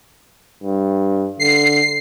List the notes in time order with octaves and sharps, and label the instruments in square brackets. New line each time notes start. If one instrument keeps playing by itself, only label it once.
[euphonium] G2
[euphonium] D3 [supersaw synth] C7